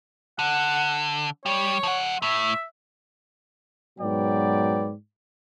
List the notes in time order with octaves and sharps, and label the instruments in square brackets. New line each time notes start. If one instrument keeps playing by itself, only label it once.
[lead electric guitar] D3 [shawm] F#5
[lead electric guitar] G3 [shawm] C#5
[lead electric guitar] F3 F#5
[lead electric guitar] A2 [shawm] E5
[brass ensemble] G#2 B2 F#3 B4 D5 G5